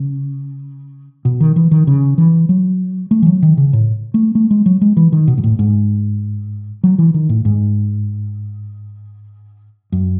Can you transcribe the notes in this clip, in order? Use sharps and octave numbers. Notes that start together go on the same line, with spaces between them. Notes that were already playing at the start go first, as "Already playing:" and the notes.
Already playing: C#3
B2
D#3
E3
D#3
C#3
E3
F#3
A3
E3
F#3
D#3
C#3
A2
A3
A3
G#3
F#3
G#3
E3
D#3
B2
G#2
A2
G#2
F#3
E3
D#3
A2
G#2
F#2